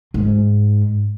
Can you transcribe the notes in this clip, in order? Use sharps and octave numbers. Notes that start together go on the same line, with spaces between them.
G#2